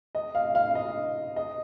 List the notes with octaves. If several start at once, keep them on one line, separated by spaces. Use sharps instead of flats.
D#5
F5
F5
D#5
D#5